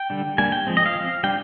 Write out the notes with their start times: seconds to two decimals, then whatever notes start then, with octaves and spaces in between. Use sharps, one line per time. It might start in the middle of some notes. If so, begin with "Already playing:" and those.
Already playing: G5
0.10 D3 G3 D4
0.38 G3 A#3 D4 G#5
0.52 G5
0.67 F3 G#3 C4
0.77 D#5
0.86 F5
0.95 F3 C4
1.24 G3 D4 G5